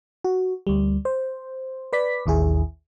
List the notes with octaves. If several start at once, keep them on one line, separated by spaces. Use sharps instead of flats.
F#4
D2 G3
C5
B4 D5 B6
A1 D#2 E4 G#4